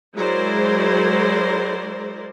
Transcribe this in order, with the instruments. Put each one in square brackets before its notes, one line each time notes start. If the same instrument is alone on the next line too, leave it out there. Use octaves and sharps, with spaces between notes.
[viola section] F#3 G#3 E4 A#4 C5 D5